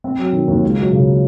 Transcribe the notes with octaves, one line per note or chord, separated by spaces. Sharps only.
C4
F#3
D#3
D#2
C#2
F#3
C#3